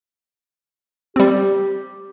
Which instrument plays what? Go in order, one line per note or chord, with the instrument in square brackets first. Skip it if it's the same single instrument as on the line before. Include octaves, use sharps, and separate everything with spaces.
[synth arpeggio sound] G3 C4 [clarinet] G4